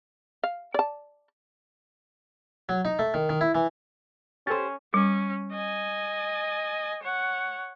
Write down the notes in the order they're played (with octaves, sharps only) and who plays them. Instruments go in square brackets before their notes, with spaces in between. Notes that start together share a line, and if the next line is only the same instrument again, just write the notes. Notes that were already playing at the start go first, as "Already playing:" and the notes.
[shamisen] F5
D5 A5
[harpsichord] F#3
D#4
A3
D#3
D#3
E4
E3
[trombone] C#4 [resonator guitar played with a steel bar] G4 C5 [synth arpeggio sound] A4 A6
[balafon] G3 [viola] C#4
[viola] D#5 G#5
C#5 F#5